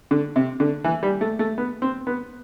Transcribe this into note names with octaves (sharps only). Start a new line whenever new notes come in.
D3
C3
D3
E3
G3
A3
A3
B3
C4
B3